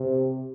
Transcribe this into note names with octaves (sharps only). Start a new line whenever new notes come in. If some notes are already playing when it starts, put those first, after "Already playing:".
Already playing: C3